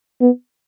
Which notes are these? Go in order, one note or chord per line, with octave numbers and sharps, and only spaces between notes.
B3